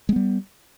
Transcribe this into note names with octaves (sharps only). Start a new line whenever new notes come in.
G3 G#3 B3